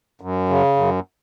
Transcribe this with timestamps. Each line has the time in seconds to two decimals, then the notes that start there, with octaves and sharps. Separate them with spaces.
0.21 F#2
0.49 C#3
0.76 F#2